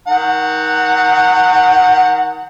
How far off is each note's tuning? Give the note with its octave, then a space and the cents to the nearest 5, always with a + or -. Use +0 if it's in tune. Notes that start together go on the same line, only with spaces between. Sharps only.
D#3 +25 F#5 +0 A#5 -30